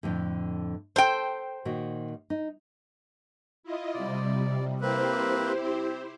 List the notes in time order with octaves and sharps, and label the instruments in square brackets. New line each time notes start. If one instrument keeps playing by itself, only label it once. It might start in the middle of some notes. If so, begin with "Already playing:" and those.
[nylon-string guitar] F2 A2 D3
[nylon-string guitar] A4 [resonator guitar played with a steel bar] C5 G5
[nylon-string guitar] A#2 D#3 F#4
D#4
[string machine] E4 F4 D#5
[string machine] C3 G3 [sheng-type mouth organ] D5
[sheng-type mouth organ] A#3 C4 B4 [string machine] E4 G4 C5
[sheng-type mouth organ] C4